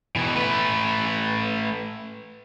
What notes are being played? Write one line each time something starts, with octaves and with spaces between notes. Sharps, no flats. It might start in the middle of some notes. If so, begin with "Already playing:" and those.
B2 E3
A3 B4